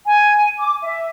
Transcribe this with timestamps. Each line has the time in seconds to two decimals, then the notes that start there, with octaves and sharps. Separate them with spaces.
0.06 G#5
0.59 D6
0.83 E5